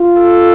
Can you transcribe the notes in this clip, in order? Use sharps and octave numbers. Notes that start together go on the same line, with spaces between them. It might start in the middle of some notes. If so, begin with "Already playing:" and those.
Already playing: F4
A4